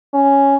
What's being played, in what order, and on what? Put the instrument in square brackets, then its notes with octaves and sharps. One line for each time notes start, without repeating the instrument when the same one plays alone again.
[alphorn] C#4